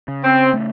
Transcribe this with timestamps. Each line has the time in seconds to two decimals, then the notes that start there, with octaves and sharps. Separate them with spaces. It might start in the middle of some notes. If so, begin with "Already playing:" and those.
0.08 C#3
0.23 C4
0.53 A3